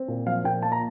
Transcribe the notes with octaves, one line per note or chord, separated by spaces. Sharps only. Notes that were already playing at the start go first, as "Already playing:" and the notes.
Already playing: C4
A#2
F3 F5
A#2 G5
A#3 A5
A#5